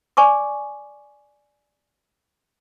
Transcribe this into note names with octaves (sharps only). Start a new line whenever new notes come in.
D5 G#5 C#6 D6